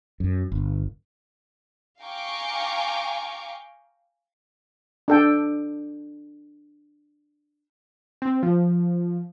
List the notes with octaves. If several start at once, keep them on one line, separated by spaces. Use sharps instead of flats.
F#2
G1
F5 G5 G#5 A#5 C#6 D6
D4 A4 G5
C4
F3